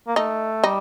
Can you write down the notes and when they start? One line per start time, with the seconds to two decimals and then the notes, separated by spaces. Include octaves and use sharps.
0.08 A#3
0.16 A3 D#4
0.64 G3 D#4